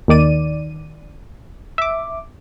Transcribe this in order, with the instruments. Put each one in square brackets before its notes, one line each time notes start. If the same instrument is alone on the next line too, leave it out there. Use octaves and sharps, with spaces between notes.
[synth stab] D#2 D#3 D5 D#7
E5 D6